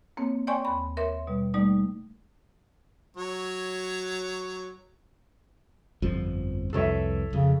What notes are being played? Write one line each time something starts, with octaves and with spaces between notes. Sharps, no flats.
A#3 C4 C#5
C#5 D5 G5 G#5 C6 C#6
D#2 B5
A#4 C#5 E5 C6
B2 G3
G3 A3 A#3 D#4 D5
F#3 C#5
G1 F2 F3
C2 F2 E3 A4 C#5 E5
F2 C#3